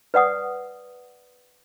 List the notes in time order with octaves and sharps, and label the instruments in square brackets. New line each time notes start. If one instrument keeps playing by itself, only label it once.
[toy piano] B4 D5 F#5 D#6